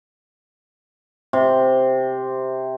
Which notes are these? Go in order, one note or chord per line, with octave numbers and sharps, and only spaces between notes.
C3